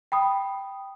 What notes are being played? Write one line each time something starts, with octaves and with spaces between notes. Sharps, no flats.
G5 B5 D#6